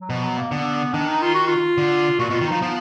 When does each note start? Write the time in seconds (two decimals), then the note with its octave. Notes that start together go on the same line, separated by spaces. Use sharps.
0.01 F#3
0.10 B2 F3
0.24 F#3
0.38 A#3
0.51 D3 B3
0.93 D#3 D4
1.08 D#4
1.22 F4
1.34 F#4
1.48 F4
1.78 D3
2.19 A#2 F#4
2.30 B2
2.33 F4
2.41 D#3
2.47 F3 D#4
2.62 F3 B3